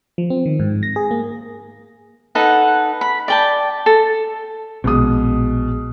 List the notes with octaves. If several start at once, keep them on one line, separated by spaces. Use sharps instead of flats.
F3
C4
D#3
G#2
A#6
G#4
A#3
D#4 A4 B4 F#5
B5
D5 G5 A5
A4
A#1 B2 G#3 D#6